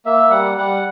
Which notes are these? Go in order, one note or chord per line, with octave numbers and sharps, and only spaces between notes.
A#3 E5
G3 F#5
G3 F#5